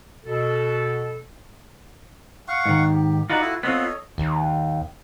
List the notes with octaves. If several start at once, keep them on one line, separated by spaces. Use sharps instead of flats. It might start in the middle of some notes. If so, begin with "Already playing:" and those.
B2 A4
F5 F#5 C#6
G#2 D#3
G4
D#4 F4 F#4 B4 D5
E4 A4
B3 C4 F4 A4 C#5 D#5
D#2